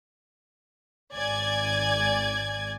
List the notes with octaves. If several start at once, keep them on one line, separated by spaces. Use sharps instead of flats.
G#1 D5 G#5 G#6